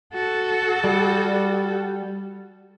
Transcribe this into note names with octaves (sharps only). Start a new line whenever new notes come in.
F#4 A4
G3